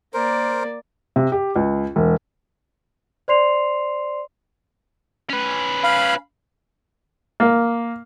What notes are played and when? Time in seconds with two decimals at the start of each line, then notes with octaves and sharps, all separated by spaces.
0.14 A#3 A#4 C5 D5
1.16 C3
1.32 G4
1.56 C#2
1.96 E1
3.28 C5 D5 C6 C7 F7
5.30 C#4 B4
5.84 F5 B5
7.40 A#3